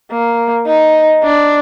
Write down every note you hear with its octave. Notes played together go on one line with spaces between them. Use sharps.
A#3
D#4
D4